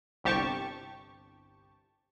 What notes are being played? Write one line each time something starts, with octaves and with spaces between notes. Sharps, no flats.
G1 C2 G4 A5 C#6